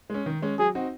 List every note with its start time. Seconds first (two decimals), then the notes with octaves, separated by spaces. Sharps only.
0.10 G#3 C#4
0.26 D#3
0.42 G#3 C#4
0.59 F#3 G#4
0.75 C4 D#4 F#4